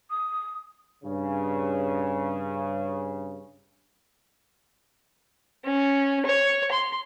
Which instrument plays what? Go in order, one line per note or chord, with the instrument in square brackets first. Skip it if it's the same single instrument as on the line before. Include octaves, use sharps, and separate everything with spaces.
[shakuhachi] D#6
[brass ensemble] G2 C#3
[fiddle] C#4
C#5
C6